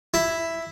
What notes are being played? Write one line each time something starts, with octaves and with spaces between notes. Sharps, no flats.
E4